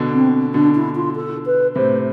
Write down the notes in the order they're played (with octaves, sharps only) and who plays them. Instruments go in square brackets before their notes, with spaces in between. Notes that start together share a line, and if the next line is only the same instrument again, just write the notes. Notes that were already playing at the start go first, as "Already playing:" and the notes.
Already playing: [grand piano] B2 D3
[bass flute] C4
[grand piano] B2 D3 [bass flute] D4
[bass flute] E4
F4
A4
B4
[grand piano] A2 C3 [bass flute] C5